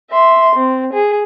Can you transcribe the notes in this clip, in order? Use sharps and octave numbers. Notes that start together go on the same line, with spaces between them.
E5 C6
C4
G#4